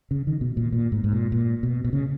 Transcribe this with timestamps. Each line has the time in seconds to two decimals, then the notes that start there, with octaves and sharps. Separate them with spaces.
0.11 C#3
0.27 D#3
0.41 B2
0.57 A#2
0.72 A#2
0.92 G#2
1.04 G#2
1.12 A#2
1.32 A#2
1.63 B2
1.84 B2
1.93 C#3